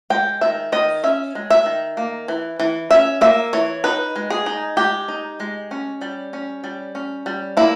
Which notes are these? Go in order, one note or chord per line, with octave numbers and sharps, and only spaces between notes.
G#3 G5
D#3 E5
D#3 D#5
C#4 E5
G#3
E5
D#3
A#3
E3
E3
C#4 E5
A#3 E5
E3 C#5
D#4 B4
G#3
G#4
D#4
G#3 G4
D#4
G#3
C#4
G3
C#4
G3
C#4
G3
A#3 E4